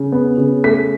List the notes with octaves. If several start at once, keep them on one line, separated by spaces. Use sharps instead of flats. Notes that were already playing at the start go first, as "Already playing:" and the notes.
Already playing: C#3
B3
C#3
A3 B6